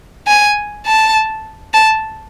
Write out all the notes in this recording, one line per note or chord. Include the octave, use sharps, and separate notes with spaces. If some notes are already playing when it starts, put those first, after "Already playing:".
G#5
A5
A5